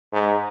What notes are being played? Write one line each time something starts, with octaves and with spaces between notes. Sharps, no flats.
G#2